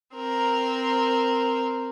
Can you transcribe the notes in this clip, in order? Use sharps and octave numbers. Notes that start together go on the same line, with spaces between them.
C4 A#4